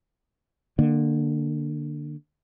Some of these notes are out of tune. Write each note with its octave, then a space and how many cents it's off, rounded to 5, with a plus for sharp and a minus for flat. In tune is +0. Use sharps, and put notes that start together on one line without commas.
D3 +20 A#3 +0